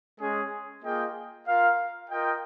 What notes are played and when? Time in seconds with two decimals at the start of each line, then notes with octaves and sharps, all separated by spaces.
0.20 G#3 C#4 G#4
0.83 A#3 F4 G#4 D#5 G5
1.47 F4 A#4 F5
2.10 F4 A#4 D#5 G5